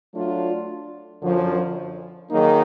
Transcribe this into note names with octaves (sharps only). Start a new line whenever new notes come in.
F#3 A3 D4 F4
F#2 D3 F3
D#3 F#3 A#3 D#4 G#4